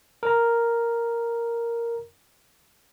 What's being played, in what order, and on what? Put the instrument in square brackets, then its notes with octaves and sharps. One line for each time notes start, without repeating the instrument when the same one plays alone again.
[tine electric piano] A#4 A#5